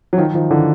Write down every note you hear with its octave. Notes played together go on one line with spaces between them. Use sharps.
F#3
D#3 F3
D#3 F3
D3 E3